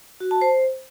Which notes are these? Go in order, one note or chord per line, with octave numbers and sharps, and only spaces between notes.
F#4
A5
C5